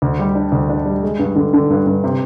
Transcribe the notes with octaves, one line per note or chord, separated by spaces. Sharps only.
D2
G3
D4
D2
D4
G3
G#3
G2
D3
D3
G2
G2
C3